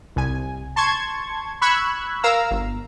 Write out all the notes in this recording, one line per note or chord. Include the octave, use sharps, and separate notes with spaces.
C2 G#5
A5 C6 C#6 G#6
B5 C#6 E6 F#6 G#6
A#4 F5 A#5 E6
G1